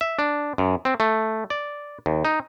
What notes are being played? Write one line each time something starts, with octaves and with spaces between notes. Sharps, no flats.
E5
D4
F#2
C4
A3
D5
D#2
D#4